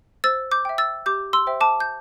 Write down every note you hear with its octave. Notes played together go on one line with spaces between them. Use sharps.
C5 E6 A6
D6 G6
E5 G5
E6 A6
G4 D6 G6
C6 E6
C5 E5 G5
A5 D6
G6